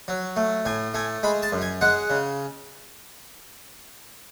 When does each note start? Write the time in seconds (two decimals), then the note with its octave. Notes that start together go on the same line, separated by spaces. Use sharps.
0.08 F#3
0.36 A3
0.65 A2 G#5
0.94 A3 G#5
1.23 G#3 B5
1.43 A5
1.52 F#2
1.62 G#5
1.81 G#3 F#5
2.10 C#3